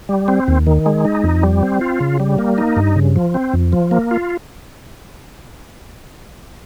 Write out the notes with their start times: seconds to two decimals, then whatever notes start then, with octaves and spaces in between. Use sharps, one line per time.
0.09 G3
0.28 C4
0.48 D#2
0.67 D#3
0.86 G#3
1.05 D#4
1.24 F2
1.43 G3
1.63 C4
1.81 F4
2.00 C#3
2.20 G3
2.38 A#3
2.58 D#4
2.76 G2
2.96 C#3
3.16 F3
3.34 C4
3.53 F2
3.73 F3
3.91 A#3
4.11 F4